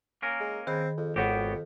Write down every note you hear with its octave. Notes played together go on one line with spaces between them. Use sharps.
A#3 C#4 A#4
G#3
D#3 C4 G#4 B5
F2
G#1 F2 B3 F#4 G4 C#5